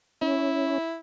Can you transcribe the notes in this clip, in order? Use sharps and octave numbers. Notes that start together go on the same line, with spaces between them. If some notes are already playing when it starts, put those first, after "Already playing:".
C#4 E4